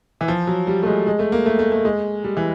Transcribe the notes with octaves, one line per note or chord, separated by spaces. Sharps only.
E3
F3
F#3
G3
A3
G#3
G#3
A3
A#3
A3
A3
A3
G#3
G3
E3